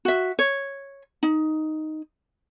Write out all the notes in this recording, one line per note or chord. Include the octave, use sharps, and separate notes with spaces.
F#4 E5
C#5
D#4